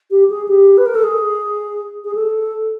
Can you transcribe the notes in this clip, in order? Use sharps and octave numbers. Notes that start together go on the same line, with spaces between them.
G4
G#4
G4
B4
A#4
A4
G#4
G#4
A4